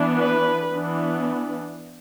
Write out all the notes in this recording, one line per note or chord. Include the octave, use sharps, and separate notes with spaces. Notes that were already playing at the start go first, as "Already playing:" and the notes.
Already playing: E3 B3 D4
B4
E3 B3 D4